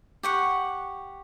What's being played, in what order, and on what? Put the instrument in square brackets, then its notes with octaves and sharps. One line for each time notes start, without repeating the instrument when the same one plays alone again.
[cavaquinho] G4 F#5 C#6